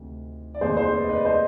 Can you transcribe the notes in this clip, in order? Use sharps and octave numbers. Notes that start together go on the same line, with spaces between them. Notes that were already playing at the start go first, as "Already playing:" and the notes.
Already playing: D2 C3 D#3
D5
F1 D#2 D#3 G#4 C5
G#4 C5
B4 D5
D#5
B4 D5
C5 D#5